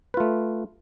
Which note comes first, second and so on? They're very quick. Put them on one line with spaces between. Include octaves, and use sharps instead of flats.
B4 F4 A3